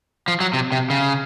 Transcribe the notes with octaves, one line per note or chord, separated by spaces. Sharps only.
F3
F#3
C3
C3
C#3